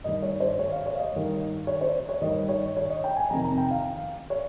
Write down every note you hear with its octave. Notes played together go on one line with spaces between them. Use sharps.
G2 D#3 D#5
C#5
C5
C#5
F5
C#5
F5
D#5
G2 D#3
C#5
C5
C#5
G2 D#3 D#5
C#5
C#5
D#5
G5
G#5
F2 C3 D#3 A#5
A#5
G5
F5
C#5